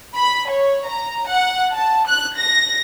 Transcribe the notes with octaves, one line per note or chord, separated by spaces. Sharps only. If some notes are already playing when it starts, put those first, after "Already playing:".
B5
C#5
A#5
F#5
A5
F#6
A#6